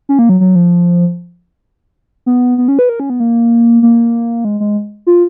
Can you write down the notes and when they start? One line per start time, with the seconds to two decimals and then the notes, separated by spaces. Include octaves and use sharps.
0.09 C#4
0.19 A#3
0.29 F#3
0.40 F#3
0.55 F3
2.26 B3
2.58 B3
2.68 C#4
2.79 B4
2.89 A#4
3.00 C#4
3.10 B3
3.20 A#3
3.83 A#3
4.45 G#3
4.60 G#3
5.07 F4